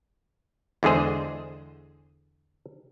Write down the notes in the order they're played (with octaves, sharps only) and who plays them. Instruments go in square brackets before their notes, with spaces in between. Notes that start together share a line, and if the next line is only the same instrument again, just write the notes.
[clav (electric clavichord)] E2 D3 G#3 G#4 C5